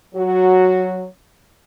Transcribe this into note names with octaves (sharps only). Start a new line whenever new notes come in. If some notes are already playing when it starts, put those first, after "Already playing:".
F#3 F#4